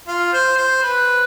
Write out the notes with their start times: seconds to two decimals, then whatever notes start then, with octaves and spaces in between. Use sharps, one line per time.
0.08 F4
0.33 C5
0.58 C5
0.82 B4